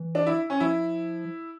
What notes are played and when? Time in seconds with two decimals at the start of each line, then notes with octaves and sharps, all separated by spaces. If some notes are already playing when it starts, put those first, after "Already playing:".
Already playing: E3
0.15 D4
0.26 E4
0.50 C#4
0.60 F3 E4